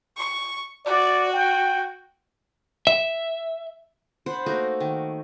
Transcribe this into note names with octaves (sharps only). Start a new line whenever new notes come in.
C#6
F#4 D5
G5
E5
D4 C5 F#5 B5
A3 A#3 D#4 F#4
D#3